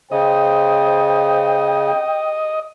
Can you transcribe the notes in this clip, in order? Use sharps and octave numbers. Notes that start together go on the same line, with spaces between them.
C#3 C5 D#5 G5